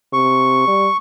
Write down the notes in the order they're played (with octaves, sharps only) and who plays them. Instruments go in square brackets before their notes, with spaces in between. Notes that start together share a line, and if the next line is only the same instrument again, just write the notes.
[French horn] C3 [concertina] C#6
[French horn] G3